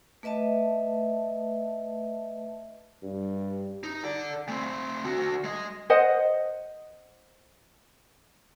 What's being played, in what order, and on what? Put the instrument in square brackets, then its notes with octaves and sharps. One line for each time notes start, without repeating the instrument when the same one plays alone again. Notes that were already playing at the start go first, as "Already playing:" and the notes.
[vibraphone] A3 B4 D#5 E5 A5
[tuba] G2
[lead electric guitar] D#4
A4 D5
A3 C4
D3 F#4
G#3 D#5
[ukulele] C5 D#5 F#5